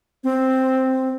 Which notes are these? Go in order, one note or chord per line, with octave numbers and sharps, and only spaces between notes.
C4